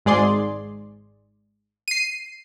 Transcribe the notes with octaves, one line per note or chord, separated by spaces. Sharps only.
G#1 G#2 G#4 D5 C6
C7 D#7